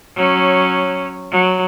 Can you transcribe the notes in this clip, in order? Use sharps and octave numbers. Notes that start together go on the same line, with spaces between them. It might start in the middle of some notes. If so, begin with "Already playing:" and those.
F#3 C#4
F#3